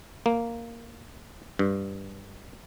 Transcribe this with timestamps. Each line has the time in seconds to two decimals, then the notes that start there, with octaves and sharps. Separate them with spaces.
0.26 A#3
1.59 G2